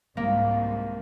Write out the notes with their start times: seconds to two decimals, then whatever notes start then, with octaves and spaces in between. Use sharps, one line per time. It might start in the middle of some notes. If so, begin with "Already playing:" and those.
0.17 C2 G#2 A#3